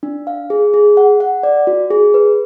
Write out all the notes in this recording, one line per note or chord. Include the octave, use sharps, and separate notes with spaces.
D4
F5
G#4
G#4
F#5
F#5
D5
F#4
G#4
B4